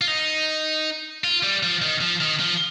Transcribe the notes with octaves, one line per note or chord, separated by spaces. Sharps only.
F4
D#4
F4
G3
F3
D#3
F3
D#3
F3